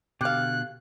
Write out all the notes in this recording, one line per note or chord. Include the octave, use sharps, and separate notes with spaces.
B2 D3 G4 F5 F#6